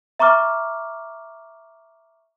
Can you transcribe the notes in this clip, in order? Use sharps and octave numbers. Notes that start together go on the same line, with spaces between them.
E5 A#5 C#6 D6 F6